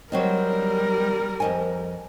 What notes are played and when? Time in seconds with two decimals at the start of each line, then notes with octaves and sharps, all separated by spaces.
0.12 F#3 G3 C4 A#4 D#5
1.40 F2 D#5 G#5